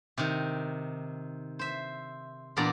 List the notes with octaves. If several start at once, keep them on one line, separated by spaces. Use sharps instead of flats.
C3 D#3
C5 E5
E2 A#2 B3 D4 D5 A#5